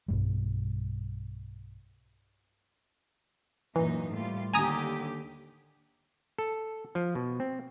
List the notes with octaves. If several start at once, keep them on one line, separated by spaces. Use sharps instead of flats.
B1 G2 G3
F#2 A#2 E3 D#4
A2 G3 F4
D#2 D3 G4 G#5 A#5 D#6
A4
F3
B2
C4